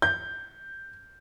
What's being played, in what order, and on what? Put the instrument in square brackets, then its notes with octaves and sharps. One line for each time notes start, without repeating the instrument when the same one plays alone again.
[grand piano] G6